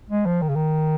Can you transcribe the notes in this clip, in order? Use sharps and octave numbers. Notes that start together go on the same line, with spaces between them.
G#3
F3
D#3
C#3
D#3